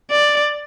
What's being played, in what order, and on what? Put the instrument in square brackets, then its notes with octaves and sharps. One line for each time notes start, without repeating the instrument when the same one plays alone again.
[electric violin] D5